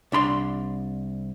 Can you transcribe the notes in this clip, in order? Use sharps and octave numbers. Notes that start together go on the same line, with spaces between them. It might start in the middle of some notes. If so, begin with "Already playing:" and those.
C2 D4 B5 C6